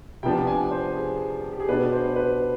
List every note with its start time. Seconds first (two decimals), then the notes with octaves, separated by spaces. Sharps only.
0.23 C3 F3 B3 D4 G5
0.47 G#5
0.71 C5
0.96 G#4
1.53 G4
1.60 G#4
1.68 B2 B3 D4 B4
1.92 C5
2.16 B4